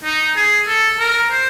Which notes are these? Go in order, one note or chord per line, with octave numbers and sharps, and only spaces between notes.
D#4
G#4
A4
A#4
C5